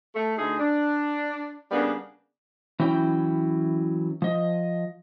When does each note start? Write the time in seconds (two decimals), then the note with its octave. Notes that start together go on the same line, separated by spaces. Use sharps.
0.16 A3
0.38 D2 D#4 G#4
0.60 D4
1.71 C#3 G3 A#3 B3 D4
2.79 E3 F#3 C#4 E4 G5
4.22 F3 D#5